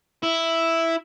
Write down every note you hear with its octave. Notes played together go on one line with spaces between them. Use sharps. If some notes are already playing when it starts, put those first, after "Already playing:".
E4